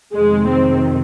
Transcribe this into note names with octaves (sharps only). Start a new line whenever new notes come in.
F2 C3 D#3 G#3
C4